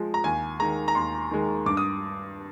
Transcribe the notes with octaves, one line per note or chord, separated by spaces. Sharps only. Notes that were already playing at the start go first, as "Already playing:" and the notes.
Already playing: F3 G#3
A#5
D#2 G#5
D#3 G#3 A#5
A#5
D#2 C6
D#3 G#3
G2 D6
D#6